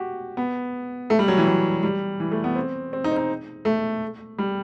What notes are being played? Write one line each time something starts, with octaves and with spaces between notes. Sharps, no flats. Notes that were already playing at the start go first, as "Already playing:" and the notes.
Already playing: F#4 G4
B3
A3
G3
F#3
E3
F#3
G3
E3
A3
B3
C4
C4
D#4
C4
D#4
A3
G3